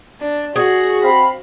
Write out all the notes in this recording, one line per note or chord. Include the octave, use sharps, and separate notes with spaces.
D4
F#4 G#4
C4 F5 B5